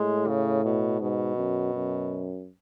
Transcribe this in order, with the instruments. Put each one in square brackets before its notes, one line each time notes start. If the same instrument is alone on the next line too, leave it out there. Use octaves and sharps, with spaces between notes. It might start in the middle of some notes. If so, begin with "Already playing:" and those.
Already playing: [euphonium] A2 [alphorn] G#3
[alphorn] C#3
B2
[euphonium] G#2 [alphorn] B2
[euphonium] F#2
F#2